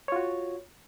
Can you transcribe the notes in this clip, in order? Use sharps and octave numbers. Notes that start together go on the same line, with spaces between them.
F4 F#4 C#5